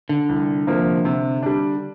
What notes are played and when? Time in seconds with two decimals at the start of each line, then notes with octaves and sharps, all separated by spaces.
0.09 D3
0.29 C2
0.67 C3 F3 A#3
1.05 C3
1.43 G3 D4